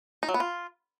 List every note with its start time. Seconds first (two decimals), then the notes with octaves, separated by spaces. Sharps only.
0.23 D#4
0.29 F#3
0.34 B3
0.40 F4